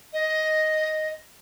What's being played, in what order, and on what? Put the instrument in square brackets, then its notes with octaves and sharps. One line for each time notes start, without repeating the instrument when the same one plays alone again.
[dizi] D#5